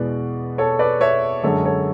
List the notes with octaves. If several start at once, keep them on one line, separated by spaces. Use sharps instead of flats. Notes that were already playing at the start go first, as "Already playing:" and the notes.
Already playing: E2 B2 G#3 B4 D5
A4 C#5
B4 D5
C#5 E5
F#2 D3 G#3 A4 C#5
A4 C#5